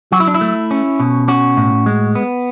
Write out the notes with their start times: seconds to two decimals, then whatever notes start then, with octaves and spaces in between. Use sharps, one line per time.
0.12 F#3 F#4
0.20 E4
0.27 D4
0.34 E4
0.41 A3
0.71 C#4
1.00 B2
1.28 C#4 F#4
1.57 A2
1.86 G#3
2.15 B3